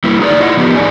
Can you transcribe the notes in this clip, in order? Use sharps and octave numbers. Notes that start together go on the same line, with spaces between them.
G3 A#3 E4 B4
D#4 G#4 B4 D5
E4 F4 D#5 F#5
F3 B3 D#4 G4
E2 A2 G#4 D5 G#5